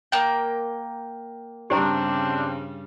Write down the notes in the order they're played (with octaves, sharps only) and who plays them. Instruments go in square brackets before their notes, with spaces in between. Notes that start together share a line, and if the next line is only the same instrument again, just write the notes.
[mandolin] A#3 G5
[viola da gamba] G2 C#3 G3 [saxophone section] C4 D4 [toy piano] G4 C5 A#5